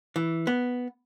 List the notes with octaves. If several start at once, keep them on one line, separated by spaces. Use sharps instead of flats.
E3
B3